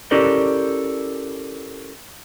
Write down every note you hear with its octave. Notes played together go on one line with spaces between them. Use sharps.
C#4 E4 G4 A4 A#4 D5